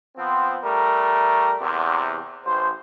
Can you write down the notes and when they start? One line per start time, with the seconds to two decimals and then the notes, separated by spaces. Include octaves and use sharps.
0.16 F3 B3 C4
0.63 G3 A3 A#4
1.60 E2 C3
2.45 A1 C5